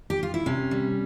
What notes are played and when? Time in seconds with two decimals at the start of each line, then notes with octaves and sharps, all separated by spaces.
0.10 G4
0.23 F4
0.34 E4
0.46 C3 C#4
0.71 G3